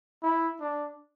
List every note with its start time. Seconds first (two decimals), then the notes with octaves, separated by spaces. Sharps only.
0.23 E4
0.60 D4